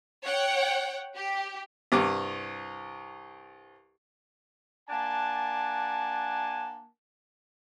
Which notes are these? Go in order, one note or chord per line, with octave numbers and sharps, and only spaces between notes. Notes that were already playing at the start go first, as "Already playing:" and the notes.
C#5 F#5 G5
G4
C2 G2 D6
A#3 D4 F#5 G#5 A5